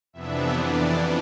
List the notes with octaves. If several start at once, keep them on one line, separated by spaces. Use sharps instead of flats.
F2 C3 E3 B3 D4 E5
D5